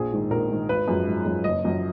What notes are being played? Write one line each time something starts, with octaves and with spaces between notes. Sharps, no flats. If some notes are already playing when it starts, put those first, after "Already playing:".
Already playing: A#1 G#4
G#2 D#3
A#1 A#4
G#2 D#3
G#1 B4
F#2 F3 G#3
G#1
F#2 F3 G#3
F#1 D#5
F#2 F3